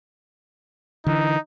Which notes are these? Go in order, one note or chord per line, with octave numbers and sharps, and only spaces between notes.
D3 E3 D#4